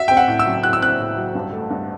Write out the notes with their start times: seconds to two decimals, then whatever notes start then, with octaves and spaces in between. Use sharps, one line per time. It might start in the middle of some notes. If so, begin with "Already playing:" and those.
Already playing: F#4 E5
0.08 C4 G5
0.17 F#5
0.28 A2
0.39 E6
0.46 F#3
0.63 F#4 F#6
0.73 E6
0.82 C4 F#6
1.00 A2
1.17 F#3
1.35 G2
1.53 A3
1.70 G2